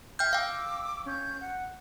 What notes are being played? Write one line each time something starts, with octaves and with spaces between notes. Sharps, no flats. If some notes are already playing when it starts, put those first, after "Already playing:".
E5 G5 F6 G6
F5 G5 D6 E6
C#4 G6
F#5